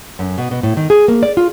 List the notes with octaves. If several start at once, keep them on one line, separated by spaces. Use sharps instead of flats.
F#2
B2
B2
A2
D#3
G#4
A#3
D5
F4